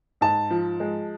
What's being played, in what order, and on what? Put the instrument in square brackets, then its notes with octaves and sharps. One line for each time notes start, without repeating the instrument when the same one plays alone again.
[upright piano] G#2 [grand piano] A5
[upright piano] F3
G#3